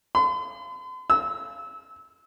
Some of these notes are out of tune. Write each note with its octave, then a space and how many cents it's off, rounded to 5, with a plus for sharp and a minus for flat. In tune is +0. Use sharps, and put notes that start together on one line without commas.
C6 -45
E6 -25